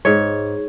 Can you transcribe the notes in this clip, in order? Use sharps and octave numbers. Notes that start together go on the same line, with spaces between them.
G#2 C#5